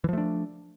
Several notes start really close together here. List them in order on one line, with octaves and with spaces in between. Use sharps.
E3 F3 A3 D4